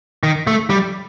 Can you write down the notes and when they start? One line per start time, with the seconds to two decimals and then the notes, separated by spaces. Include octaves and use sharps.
0.23 D#3
0.47 A3
0.70 G3